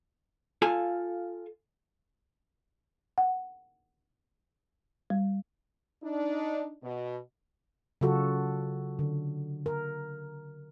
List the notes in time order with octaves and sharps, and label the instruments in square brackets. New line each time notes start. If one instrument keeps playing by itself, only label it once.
[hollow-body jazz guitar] F4 A4 F5 G#5
[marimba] F#5
G3
[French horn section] D4 D#4
B2
[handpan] C#3 F#3 F4 F#4 A4
D3
A#4